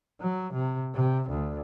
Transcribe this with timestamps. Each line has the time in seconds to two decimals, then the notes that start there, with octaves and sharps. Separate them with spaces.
0.20 F#3
0.54 C3
0.95 C3
1.30 D2